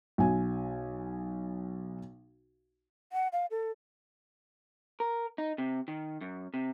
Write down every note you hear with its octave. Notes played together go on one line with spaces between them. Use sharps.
B1 G#5
F#5
F5
A4
A#4
D#4
C3
D#3
F#2
C3